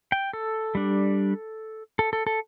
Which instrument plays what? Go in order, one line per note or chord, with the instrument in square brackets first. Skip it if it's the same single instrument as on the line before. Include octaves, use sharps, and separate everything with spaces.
[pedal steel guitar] G5
A4
G3 D4
A4
A4
A4